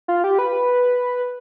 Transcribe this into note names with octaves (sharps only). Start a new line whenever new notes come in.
F4
G4
B4